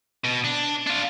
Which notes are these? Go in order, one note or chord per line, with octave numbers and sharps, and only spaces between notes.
B2
D4
D4 F4